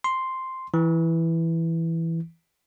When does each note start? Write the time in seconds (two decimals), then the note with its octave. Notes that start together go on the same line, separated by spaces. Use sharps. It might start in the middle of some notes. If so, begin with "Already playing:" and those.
0.04 C6
0.74 E3